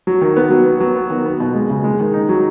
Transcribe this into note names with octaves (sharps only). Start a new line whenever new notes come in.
F#3
D#3
B3
F#3
B3
F#3
B3
D#3
B3
B2
G#3
C#3
G#3
D#3
D#4
F#3